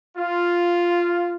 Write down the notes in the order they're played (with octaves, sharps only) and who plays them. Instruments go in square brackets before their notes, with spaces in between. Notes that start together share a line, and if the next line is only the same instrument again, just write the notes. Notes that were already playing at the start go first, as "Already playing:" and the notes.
[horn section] F4